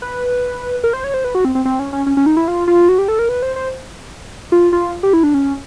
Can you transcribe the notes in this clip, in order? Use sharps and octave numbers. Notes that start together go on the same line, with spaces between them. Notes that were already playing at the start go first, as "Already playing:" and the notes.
B4
A#4
C5
C#5
C5
B4
F#4
C4
C4
C4
C#4
C#4
C#4
C#4
D#4
E4
F4
F4
F#4
G4
A4
A#4
B4
C5
C5
F4
F4
G4
E4
D4
C#4